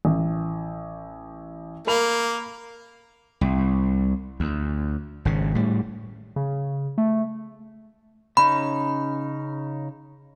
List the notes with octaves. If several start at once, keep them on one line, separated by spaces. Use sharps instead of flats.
A1
A#3 A#4 B5 F7
C2
D2
G#1 C#3
A2 G3
C#3
A3
C#3 C#4 D#4 B5